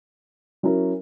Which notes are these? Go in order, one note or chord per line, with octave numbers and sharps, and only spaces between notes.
F#3 C#4 E4 A#4